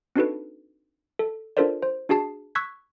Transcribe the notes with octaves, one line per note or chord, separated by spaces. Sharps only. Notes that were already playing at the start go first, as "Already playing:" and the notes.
C4 D4 D#4 F#4 A4 B4
A4
D4 F4 A4 A#4 C5 D5
C5
D4 F#4 G#4 A5 C7
C#6 E6 F#6 G#6 B6